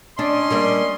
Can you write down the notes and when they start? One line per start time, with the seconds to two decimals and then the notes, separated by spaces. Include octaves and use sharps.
0.19 C#4 D4 D#5 C6
0.50 G3 A#3 D4